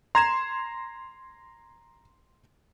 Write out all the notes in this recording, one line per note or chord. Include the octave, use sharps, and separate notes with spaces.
A#5 C6 G#6 E7